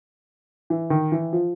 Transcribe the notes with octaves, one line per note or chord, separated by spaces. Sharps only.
E3
D#3
E3
F3